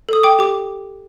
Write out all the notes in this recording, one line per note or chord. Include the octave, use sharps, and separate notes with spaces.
A4 D#6
G5 D6
G4 D6